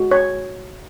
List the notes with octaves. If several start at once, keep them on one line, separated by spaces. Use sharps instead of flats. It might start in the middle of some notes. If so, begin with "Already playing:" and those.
Already playing: G#3 F#4
C#5